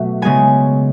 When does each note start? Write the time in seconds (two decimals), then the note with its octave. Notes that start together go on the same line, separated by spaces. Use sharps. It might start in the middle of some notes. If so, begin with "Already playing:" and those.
Already playing: B2 F#3 A3 F#4 E5
0.22 C#3 G#3 B3 G#5